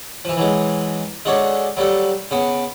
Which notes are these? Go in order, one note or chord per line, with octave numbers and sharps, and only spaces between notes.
E3 F3
E3 F#3 G#3
G#3 D4 F#4 A4 C#5
F#3 G3 F#4 A4
C#3 B3